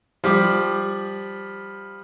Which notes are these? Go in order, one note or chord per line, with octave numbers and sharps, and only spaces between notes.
F3 G3 D6